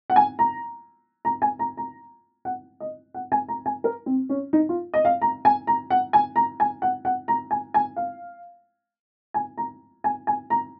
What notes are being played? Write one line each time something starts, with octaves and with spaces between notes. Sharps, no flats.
F#5
G#5
A#5
A#5
G#5
A#5
A#5
F#5
D#5
F#5
G#5
A#5
G#5
A#4
C4
C#4
D#4
F4
D#5
F5
A#5
G#5
A#5
F#5
G#5
A#5
G#5
F#5
F#5
A#5
G#5
G#5
F5
G#5
A#5
G#5
G#5
A#5